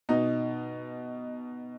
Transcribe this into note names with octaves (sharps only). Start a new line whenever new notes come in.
B2 D#4